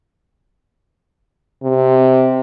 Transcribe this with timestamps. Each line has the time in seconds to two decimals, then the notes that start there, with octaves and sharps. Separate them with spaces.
1.63 C3